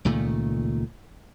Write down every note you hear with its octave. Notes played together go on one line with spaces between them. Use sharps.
C#2 A#2 D#3 A3